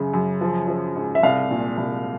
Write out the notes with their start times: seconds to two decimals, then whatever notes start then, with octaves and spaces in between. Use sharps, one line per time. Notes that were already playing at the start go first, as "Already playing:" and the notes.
Already playing: F#2 C#3
0.14 F#2
0.41 F3
0.68 F3
0.96 G#2
1.15 E5
1.23 C2 F5
1.51 A#2
1.77 C2